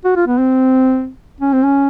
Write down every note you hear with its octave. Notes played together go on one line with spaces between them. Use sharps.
F#4
F4
B3
C4
C#4
C4
C#4